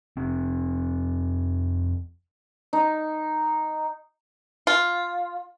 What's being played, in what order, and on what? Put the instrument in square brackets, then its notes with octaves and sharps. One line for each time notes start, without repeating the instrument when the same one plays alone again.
[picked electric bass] F1 C3 C4
[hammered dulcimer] D#4
[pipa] F4